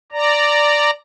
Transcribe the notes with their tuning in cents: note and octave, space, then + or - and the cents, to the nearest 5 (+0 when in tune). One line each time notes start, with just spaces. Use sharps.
D5 +0 A#5 -15